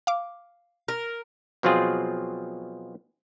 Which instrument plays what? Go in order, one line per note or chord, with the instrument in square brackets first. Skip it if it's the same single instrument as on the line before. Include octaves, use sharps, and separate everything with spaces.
[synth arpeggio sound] F5 D6
[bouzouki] A#4
[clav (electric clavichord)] B2 F3 F#3 C4 F4 G#4